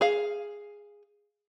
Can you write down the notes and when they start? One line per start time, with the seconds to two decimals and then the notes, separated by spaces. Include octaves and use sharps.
0.01 G#4 F5